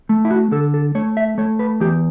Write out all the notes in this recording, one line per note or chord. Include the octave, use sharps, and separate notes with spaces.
A3
E4
F#4
D3 A4
A4
A3 C#5
E5
A3 C#5
B4
E2 G4